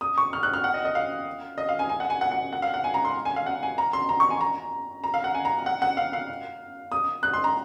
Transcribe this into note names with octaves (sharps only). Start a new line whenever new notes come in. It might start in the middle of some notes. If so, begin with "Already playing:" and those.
D#6
C#6
F6
F#6
F6
F#5
D#5
D#5
F5
D#5
F5
G#5
G#5
F#5
G#5
F#5
F#5
F#5
F5
F#5
G#5
A#5
C6
G#5
F5
F#5
G#5
A#5
C6
A#5
C#6
G#5
A#5
A#5
F5
F#5
G#5
A#5
F#5
F#5
F5
F5
D#6
F#6
C6
A#5